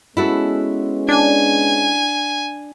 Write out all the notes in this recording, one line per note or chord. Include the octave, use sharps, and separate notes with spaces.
G#3 B3 C#4 E4 F#4 A4
D4 G#5